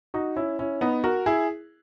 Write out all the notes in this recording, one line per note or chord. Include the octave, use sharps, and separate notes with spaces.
D#4 F#4
C#4 E4
C#4 E4
B3 D#4
F#4 A#4
E4 G#4